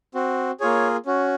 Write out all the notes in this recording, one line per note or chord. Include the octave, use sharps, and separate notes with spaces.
C4 F#4
A#3 F4 G#4 C#5
C#4 F#4